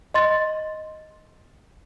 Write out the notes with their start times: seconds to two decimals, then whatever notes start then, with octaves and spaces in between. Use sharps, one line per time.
0.14 D#5 C6 A6